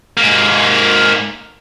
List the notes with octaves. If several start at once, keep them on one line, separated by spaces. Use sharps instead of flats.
G#2 A#3